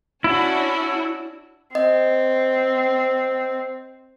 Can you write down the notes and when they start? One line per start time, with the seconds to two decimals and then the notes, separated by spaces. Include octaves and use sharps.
0.24 C#4 D4 E4 F#4
1.75 C4 D#5